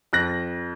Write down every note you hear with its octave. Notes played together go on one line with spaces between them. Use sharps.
F2 F#6 A#6